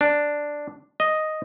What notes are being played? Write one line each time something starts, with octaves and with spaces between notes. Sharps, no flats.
D4
D#5